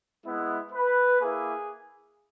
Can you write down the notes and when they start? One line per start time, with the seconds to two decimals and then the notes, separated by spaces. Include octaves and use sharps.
0.25 G#3 B3 E4
0.72 B4
1.20 A#3 E4 G#4